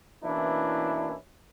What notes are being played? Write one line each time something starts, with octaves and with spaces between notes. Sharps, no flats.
B2 E3 A#3 C#4 D4 E4